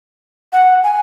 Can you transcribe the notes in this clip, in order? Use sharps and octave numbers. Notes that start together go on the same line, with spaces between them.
F#5
G#5